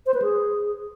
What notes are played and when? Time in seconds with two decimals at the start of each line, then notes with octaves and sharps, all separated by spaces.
0.06 C5
0.14 B4
0.22 G#4